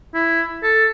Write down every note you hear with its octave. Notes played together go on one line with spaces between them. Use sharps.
E4
A4